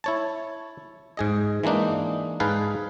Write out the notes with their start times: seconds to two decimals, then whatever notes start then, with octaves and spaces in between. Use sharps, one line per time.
0.04 E4 C#5 A5
1.17 G#2 G#4 D#5
1.64 E3 G#3 A#3 D4 D#4
2.40 G#2 D#4 G#4 B4 F5 A5